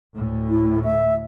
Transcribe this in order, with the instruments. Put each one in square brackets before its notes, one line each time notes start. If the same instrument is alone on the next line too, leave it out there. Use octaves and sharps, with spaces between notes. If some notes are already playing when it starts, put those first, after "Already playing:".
[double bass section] D2 A2
[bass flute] E4
E5